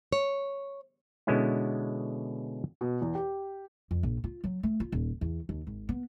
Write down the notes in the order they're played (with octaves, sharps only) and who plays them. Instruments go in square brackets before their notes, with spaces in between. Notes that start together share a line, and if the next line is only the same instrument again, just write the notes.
[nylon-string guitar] C#5
[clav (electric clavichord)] B2 D3 G#3 B3 C#4 E4
[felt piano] B2
E2
G4
[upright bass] F2
A#1
F4
F#3
A3
F4
D#1
E2
D#2
G#1
B3